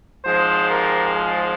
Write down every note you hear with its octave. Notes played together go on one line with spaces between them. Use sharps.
G#1 G#2 F3 G#3 G#4 C5
G4 A#4
F4 G#4